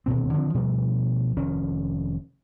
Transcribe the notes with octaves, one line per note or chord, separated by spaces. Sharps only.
D#1 D2 B2 C4
D3 D#3 F3 C4
B2 F3 G3 A3
F1 D#3 C#4